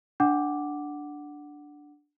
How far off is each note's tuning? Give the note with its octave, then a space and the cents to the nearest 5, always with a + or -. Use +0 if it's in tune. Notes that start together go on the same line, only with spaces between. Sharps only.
D4 +0 F#5 +0 D6 +0